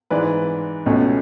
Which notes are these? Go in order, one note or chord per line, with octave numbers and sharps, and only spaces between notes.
G#2 E3 G#3 B4 D5
C#2 B2 A3 C#4